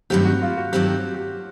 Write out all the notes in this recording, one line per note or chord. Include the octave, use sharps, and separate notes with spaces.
G2 D#3 F#3 A3 C4 G4
F#4
F4
F#4
G2 D#3 F#3 A3 C4 G4
G4